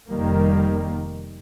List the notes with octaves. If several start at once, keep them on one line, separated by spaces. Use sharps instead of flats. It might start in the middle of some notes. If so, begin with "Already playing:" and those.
F1 D#3 G3 A#3